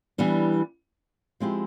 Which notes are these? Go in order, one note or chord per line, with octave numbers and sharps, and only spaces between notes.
E3 G3 B3 D4
F3 G#3 C4 E4 G4